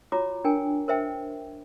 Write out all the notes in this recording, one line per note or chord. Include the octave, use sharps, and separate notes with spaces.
F4 F#4 C#5 A#5 D6
D4 A#4 G5 G#5
A#4 C5 E5 G5